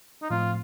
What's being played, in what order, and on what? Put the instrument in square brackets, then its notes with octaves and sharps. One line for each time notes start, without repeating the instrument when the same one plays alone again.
[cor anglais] D#4
[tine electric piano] A2 F3 A3 C4 [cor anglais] F4